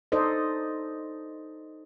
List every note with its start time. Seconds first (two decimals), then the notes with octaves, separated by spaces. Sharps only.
0.12 D#4 A4 C5 D5 D#5